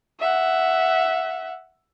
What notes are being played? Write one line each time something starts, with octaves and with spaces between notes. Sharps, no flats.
E5 F#5